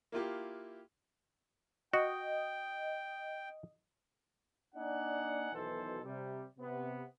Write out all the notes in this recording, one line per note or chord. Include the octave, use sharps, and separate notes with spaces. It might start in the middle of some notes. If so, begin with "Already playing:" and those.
A#3 E4 F4 G4
F#4 D#5 G5
A#3 D4 D#4 D5 F#5 G#5
B1 B2 D#3 E3 A4 C5
C3 G3
C3 B3